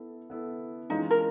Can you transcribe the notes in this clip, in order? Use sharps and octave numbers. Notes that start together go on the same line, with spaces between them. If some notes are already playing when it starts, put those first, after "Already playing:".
Already playing: B3 E4 A4
B3 E4 A4
E3 G#3 C#4 D#4 F4
A#4